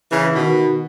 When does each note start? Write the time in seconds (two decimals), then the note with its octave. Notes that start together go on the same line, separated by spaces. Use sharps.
0.11 C#3 E3
0.34 B2 D#3